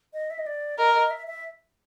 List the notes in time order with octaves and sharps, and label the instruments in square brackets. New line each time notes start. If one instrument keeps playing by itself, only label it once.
[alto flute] D#5
E5
D#5
D5
[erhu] A#4 [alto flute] D#5
[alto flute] D#5
E5
E5